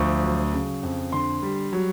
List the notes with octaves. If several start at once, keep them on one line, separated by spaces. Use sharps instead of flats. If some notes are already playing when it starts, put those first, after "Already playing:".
Already playing: D2 F3 C#6
F#3
C#3
F2
D3 C6
G3
F#3